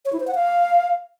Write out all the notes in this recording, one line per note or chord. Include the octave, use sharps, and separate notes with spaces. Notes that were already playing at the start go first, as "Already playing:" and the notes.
C#5
E4
C5
F#5
F5